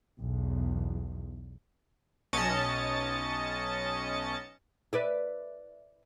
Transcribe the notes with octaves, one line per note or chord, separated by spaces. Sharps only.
B1 E2
B1 C#4 D#5 A5 A6 C#7
B4 D5 E5